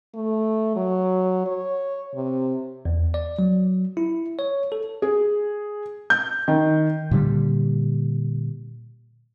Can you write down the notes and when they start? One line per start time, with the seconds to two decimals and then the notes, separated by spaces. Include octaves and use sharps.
0.15 A3
0.76 F#3
1.46 C#5
2.14 C3
2.85 E2
3.14 D5
3.39 F#3
3.97 E4
4.39 C#5
4.72 A4
5.02 G#4
6.10 G6
6.48 D#3
7.11 A#2 D3 G3